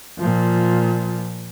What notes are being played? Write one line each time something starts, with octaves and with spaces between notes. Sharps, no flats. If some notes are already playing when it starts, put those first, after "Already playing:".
A#2 F3